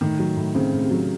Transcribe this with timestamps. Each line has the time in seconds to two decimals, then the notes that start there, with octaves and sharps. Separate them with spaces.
0.01 A2 D#3
0.19 F#3
0.37 A2
0.55 C#3 C4
0.73 A2
0.82 C3
0.91 F#3